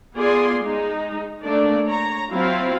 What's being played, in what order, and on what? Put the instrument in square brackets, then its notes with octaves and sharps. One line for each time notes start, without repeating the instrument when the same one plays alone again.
[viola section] B3 F4 G#4 D5 G#5 C6
G#3 D#4
A3 A#3 D4 D5
C#5 A#5
F#3 C4 E4 F4 F5